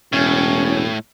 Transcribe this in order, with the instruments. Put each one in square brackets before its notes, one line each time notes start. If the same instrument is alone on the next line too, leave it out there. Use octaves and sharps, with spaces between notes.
[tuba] E1 [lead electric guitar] A2 [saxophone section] C#4